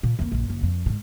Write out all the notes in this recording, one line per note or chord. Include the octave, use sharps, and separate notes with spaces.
A#2
F2 A#3
A#1 F#2
F#1
F2
G#2 B2